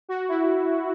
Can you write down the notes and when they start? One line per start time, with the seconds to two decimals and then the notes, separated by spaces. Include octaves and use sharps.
0.09 F#4
0.29 E4